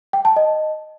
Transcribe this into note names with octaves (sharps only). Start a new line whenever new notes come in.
G5
A5
D#5